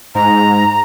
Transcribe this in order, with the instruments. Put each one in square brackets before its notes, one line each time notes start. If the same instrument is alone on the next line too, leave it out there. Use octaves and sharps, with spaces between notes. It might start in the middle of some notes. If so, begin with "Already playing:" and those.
[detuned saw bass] G#2 [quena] A#5